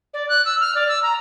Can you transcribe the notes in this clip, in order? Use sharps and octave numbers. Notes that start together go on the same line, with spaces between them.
D5
F#6
E6
F6
D5
E6
A#5